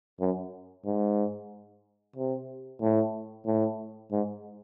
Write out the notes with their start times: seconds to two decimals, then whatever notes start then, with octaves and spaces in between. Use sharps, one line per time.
0.20 F#2
0.85 G#2
2.16 C3
2.81 A2
3.46 A2
4.11 G#2